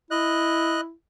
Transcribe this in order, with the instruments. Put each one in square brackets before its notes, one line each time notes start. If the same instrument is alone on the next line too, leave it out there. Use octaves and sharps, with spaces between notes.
[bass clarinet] E4 [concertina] D#5 F#6